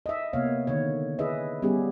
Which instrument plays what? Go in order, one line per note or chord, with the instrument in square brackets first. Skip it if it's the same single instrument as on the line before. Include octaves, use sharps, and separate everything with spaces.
[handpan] D#5 E5
C3 A#3 B3 C#5 F5
D3 D#3 C#5
E4 G#4 B4 D#5 E5
G3 B3 C#4 G4 G#4